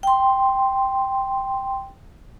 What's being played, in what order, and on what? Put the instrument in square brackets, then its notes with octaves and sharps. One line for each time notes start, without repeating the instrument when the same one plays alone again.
[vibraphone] G5 C6